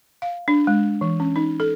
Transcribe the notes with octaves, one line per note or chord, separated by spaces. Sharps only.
F5
D4
G#3
E3
C#4
D#4
A4